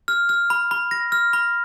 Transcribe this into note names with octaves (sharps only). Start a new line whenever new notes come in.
F6
F6
B5
B5
A#6
F6
B5